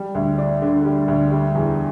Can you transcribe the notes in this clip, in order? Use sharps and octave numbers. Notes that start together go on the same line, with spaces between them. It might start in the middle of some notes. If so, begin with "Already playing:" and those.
Already playing: G3
D2
D4
D3
G3
D2
G3
E2